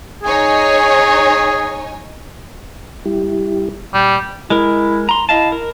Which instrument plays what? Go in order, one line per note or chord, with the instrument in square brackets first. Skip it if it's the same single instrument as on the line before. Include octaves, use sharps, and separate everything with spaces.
[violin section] D#4 C#5 G#5 [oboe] G#4
[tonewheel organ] G3 E4 G4
[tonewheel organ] A#2 [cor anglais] G3
[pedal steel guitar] G#3 A#4 [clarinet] E4
[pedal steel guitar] A#5 C6
[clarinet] E4 [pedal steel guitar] D#5 F5 A5
[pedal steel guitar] A#4